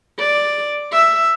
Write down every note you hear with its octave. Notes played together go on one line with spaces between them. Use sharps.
D5
E5